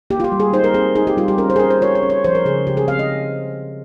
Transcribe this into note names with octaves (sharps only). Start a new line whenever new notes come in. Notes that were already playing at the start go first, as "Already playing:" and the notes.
A#3 G4
F4
G4
G3
G#4
D#4 C5
A#4
C4 G#4
D#4 G#4
G4
G3 F4
G4
C#4 A#4
C5
G#4
C#4 A#4
C5
F4 C#5
C#5
C#4
C#5
F3 C5
A#4
C#3 G#4
C#3 G4
G#4
C4 F5
D#5